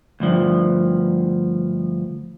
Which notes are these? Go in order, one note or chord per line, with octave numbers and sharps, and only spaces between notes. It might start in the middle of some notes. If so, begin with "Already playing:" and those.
D2 G2 F3